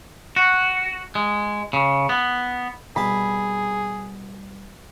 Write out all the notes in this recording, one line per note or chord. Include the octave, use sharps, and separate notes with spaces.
F#4
G#3
C#3
B3
C2 B2 G#4 A5 B5